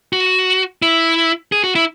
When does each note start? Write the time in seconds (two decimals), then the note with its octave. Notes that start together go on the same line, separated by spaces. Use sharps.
0.13 F#4
0.82 E4
1.52 G#4
1.64 F#4
1.75 E4